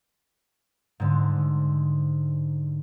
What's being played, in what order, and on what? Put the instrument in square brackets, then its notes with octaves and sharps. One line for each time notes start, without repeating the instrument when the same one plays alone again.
[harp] G#2 D3